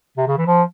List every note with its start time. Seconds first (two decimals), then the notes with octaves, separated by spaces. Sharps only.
0.18 C3
0.28 C#3
0.38 E3
0.47 F3